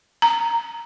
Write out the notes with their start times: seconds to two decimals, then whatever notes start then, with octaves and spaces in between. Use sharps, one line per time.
0.22 A#5